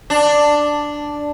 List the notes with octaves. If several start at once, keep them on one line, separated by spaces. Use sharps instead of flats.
D4